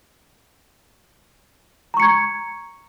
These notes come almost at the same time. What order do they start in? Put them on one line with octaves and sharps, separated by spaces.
A#5 C#6 C#7 G#6